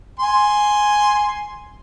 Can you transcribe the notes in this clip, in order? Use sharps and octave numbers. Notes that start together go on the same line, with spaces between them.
G#5 C6